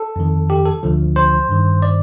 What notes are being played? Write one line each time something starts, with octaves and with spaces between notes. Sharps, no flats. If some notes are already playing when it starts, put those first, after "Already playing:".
Already playing: A4
F2 D#3
G4
A4
D2 D3 F3
C5
G2 D#3
D5